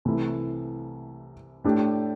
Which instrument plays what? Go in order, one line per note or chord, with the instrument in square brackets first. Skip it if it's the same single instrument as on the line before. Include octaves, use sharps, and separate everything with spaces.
[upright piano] C2 C3 E3 A3 E4
A2 A3 D4 G4